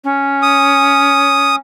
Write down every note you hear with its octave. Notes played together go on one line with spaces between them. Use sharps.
C#4
D#6